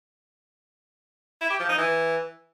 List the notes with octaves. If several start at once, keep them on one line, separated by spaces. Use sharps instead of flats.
E4
G4
F3
D#4
E3